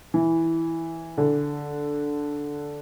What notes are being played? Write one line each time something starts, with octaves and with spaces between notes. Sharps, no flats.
E3
D3